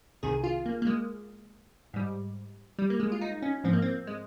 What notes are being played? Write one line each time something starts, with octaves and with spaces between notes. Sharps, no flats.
C2 C3 D#3 G#4
F4
A#3
A#3
G#3
G#2 G3
G3
A#3
G#3
F4
D#4
C#4
G#2 F3 C4
A#3
C4
G#3